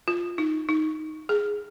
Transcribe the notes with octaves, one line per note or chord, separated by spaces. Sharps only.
F4
D#4
D#4
G#4